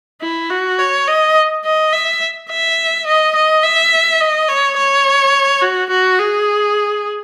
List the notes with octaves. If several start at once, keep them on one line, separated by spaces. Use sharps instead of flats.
E4
F#4
C#5
D#5
D#5
E5
E5
D#5
D#5
E5
D#5
C#5
C#5
F#4
F#4
G#4